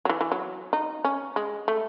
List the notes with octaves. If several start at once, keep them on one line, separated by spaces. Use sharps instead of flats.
F#3
E3
E3
F#3
D#4
C#4
G#3
A3